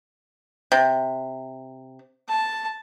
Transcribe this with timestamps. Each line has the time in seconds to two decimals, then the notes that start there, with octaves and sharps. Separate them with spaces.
0.72 C3
2.28 A5